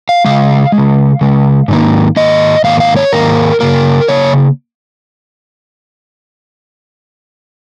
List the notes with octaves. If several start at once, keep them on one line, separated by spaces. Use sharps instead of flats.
F5
C#3 G#3 F5
G#3
C#3
C#3 G#3
G#2 D#3 A#3
G#2 D#3 A#3 D#5
G#2 D#3 A#3 F5
F5
C#5
G#2 D#3 A#3 A#4
C#3 A#3 A#4
C#3 A#3 C#5